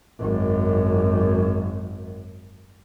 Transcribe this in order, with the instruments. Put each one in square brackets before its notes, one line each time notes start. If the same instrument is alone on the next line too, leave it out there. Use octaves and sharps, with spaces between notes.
[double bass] G#1 F#2